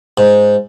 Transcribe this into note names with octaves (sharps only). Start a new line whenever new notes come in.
G#2